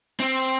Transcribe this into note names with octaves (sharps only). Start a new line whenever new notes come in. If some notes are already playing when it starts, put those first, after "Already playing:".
C4